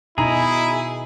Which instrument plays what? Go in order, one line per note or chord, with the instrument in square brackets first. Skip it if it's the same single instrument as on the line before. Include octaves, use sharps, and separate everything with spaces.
[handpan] B2 D#4 [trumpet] E4 [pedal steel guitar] G#4 [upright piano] A#5